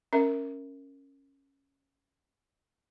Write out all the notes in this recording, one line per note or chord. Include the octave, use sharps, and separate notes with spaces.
C#4 A#4 E5